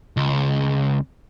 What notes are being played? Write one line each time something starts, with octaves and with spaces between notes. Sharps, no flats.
C#2